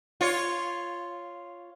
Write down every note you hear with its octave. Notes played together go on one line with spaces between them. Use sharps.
F4 C#5